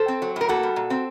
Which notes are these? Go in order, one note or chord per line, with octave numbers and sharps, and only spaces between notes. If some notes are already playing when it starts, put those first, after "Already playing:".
Already playing: A4 C5
C4
F#3
A2 A#4
A#3 F#4 A4
G3
A#2
C4